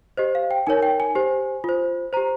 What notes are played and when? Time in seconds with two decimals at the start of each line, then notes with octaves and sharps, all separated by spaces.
0.17 G4 C5 D#5
0.35 F5
0.51 G5
0.67 D#4 A#4 C#5 G#5
0.83 G5
1.00 G#5
1.15 G4 C5
1.64 F4 C5
2.13 G4 C5 A#5